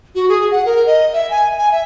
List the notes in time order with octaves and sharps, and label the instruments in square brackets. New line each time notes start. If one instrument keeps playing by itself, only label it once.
[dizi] F#4
G#4
F#5
A#4
D#5
E5
G#5
G#5
E5